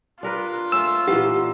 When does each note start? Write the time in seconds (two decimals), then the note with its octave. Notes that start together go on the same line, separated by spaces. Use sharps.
0.23 D4 F4 A#4 B4
0.72 A3 C#4 E6
1.08 A#2 E3 B3 G4